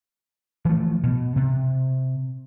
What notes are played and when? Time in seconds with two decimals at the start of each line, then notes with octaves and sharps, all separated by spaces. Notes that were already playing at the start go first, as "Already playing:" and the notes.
0.65 E3 F3 A3
1.03 B2
1.36 C3